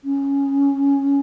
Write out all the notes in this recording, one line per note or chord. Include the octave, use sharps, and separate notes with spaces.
C#4